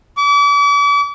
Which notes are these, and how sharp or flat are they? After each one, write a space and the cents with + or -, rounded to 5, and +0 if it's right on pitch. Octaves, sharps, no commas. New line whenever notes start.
D6 -40